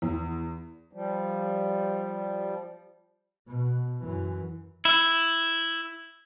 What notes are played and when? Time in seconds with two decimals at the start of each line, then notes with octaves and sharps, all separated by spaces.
0.02 E2
0.93 F3 G3
3.48 B2
4.04 F#2 E3
4.85 E4